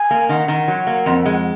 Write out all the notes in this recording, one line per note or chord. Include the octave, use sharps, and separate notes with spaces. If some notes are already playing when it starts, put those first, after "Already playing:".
Already playing: G#5
A#3
D#3 F#5
D#3
F#3
A#3
F2
G#3